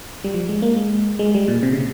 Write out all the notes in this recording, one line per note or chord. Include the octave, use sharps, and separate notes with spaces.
G3
F3
G#3
A#3
G#3
G#3
G3
A#2
C3
C#3